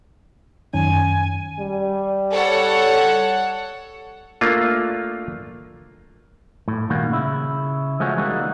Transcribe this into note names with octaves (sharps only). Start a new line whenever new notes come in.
F#2 D#3 C#4 G#5
G3
A4 C#5 F#5
A3 A#3 D4 F4
A2
A#2 D#3 G3 A#3 F#4
C#3 E4
F3 G#3 A3 C#4 F#4
E3 G3 G#3 A#3 D#4 F#4